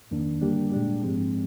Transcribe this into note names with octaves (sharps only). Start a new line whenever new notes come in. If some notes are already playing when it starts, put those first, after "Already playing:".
F2 D#3 A#3 D4
D3 G3 A#3 D4 G4
A#2 G#3 D4 G4
G#2 F3 G#3 C4